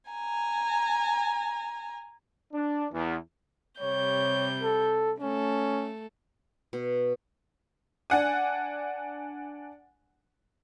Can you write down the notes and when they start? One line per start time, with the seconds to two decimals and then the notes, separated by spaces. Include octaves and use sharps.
0.11 G#5 A#5
2.53 D4
2.92 E2
3.80 C3 G3 C#5 G6
4.62 A4
5.20 A3 C#4 A4
6.73 B2
8.10 D4 F#5 G#5